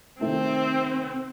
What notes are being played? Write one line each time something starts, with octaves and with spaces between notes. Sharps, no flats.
C3 D#3 A3 C4